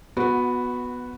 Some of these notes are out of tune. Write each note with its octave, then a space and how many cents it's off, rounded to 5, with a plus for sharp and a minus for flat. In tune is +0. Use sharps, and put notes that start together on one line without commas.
B3 +0 F#4 -20 B4 +0